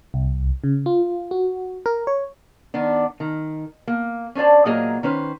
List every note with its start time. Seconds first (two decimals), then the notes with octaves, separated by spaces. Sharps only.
0.14 C2
0.64 C#3
0.86 F4
1.31 F#4
1.86 A#4
2.07 C#5
2.74 D#3 B3 D4
3.20 D#3
3.87 A#3
4.35 C#4 D4 C5 D5 A5
4.65 A#2 F#3 A#3 G#4 D#5 A#5
5.03 D#3 C#4 B4 C5